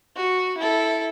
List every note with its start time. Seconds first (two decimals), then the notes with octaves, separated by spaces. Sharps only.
0.16 F#4
0.58 E4 A4